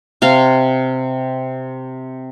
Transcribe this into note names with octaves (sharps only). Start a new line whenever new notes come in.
C3 F5